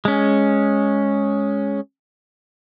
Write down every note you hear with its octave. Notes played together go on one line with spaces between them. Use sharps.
G#3 C#4